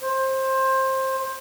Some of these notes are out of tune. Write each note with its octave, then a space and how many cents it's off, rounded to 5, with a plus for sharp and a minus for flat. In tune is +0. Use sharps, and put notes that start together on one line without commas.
C5 +20